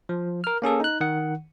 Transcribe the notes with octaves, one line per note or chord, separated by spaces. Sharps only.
F3
A#4 F6
A#3 C#4 G#4 A4
D#4 F#6
D#3 F#5